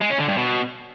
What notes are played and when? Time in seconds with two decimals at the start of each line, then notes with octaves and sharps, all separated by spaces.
0.01 G#3
0.10 C#4
0.19 D3
0.28 G2
0.37 B2